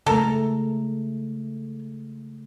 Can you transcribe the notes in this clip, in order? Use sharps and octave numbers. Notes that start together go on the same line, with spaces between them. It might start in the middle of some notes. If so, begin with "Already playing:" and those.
C#3 G#3 A3 A4 A#4 A#5